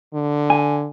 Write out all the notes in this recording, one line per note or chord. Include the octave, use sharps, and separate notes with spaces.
D3
G#5